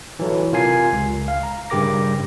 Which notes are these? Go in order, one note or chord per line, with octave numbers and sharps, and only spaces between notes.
E3 F#3 A4
C3 F4 A#4 G#5 C7
C#2
F5
A#5
G2 C#3 G4 A#4 D6 A#6